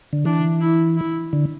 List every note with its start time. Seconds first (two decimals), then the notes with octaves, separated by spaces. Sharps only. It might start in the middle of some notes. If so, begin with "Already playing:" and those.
0.13 D3
0.25 E3 D4
0.61 E4
0.97 E4
1.33 D3